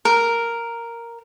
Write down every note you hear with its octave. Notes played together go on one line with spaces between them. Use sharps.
A#4